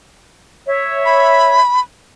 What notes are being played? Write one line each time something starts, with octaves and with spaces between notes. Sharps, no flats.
C#5 E5
B5